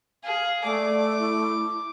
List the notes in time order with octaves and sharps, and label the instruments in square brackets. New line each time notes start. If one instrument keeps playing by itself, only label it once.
[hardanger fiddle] G#4 [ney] F5
[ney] A3 [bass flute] D5 [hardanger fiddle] D6
[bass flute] E4